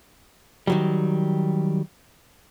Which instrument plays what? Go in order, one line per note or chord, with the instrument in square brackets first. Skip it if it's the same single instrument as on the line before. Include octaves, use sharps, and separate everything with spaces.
[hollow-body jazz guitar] D#3 F#3 G3